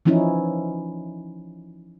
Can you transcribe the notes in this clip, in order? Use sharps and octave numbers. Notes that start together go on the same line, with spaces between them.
E3 F3 C#4 D#4 E4